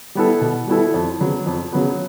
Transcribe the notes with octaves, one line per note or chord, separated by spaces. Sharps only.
G3 B3 E4 A4
B2
G3 B3 E4 A4
F2
C#3 F#3 B3
F2
C#3 F#3 B3